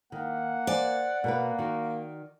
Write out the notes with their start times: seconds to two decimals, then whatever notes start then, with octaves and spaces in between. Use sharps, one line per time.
0.12 D#3 A#3 F#5
0.67 C5 D5 G#5
1.24 B2 A#3 A#4 B4
1.59 D#3 F#4